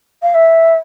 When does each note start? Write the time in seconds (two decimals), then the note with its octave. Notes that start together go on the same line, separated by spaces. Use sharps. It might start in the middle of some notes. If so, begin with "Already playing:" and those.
0.22 F5
0.34 E5